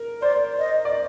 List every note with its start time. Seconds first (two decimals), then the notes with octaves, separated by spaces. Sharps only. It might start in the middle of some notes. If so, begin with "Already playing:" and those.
Already playing: A#4
0.22 C5 D5
0.59 D#5
0.85 D5